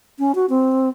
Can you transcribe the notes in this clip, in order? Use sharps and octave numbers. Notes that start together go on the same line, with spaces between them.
C#4
F#4
C4